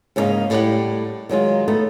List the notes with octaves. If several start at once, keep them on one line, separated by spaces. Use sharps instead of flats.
G#2 C#3 F#3 A#3 D#4 F5
A2 G3 G4 F#5
D#3 F#3 G#3 F4
A3 B3 D#4